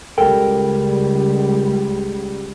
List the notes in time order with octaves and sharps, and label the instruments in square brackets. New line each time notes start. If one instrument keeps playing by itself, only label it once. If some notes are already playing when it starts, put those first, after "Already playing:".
[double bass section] C#2 G3 [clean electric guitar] A4 A#4 G5